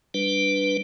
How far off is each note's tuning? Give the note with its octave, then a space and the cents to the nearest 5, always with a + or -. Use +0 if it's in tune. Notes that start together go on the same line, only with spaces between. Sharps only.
G3 +0 D4 +0 B4 +0